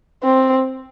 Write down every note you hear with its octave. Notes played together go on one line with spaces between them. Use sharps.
C4